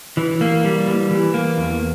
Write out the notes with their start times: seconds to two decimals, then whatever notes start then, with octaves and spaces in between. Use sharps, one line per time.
0.17 E3
0.41 A#3
0.65 G3
0.88 E3
1.11 E3
1.34 A#3
1.58 E2